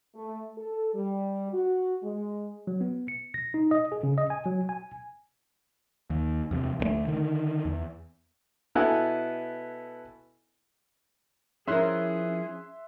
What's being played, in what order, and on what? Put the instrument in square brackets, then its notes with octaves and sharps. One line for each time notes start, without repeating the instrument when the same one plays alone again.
[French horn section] A3
A4
G3
F#4
G#3
[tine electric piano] F#3
B3
C#7
A#6
D#4
D#5
G#4
C#3
D#5
G#5
F#3
G#5
[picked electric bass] D#2
E2 C3
D2 C#3 A3
D3 D#3
E2
[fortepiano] B2 B3 E4 A4 G#5 F#6
[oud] F3 E4 A#4 [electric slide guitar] C#4 [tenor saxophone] G#4 [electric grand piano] E5 C6 F#6